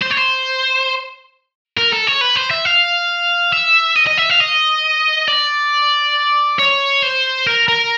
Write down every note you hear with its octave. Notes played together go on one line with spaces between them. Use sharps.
C5
C#5
C5
A#4
A4
C#5
B4
C5
E5
F5
E5
D#5
D#5
E5
F5
D#5
D5
C#5
C5
A#4
A#4